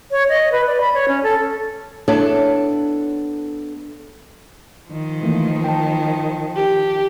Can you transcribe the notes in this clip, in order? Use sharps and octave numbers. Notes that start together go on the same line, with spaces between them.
C#5
D#5
B4
D5
B5
C#5
C#4
A4
B3 D4 E4 A4 C#5 E5
D#3 F3
E3 A3 A#3
G5 A5
G4